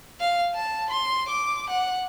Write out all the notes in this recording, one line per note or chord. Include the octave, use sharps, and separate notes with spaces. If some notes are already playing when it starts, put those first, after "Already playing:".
F5
A5
C6
D6
F#5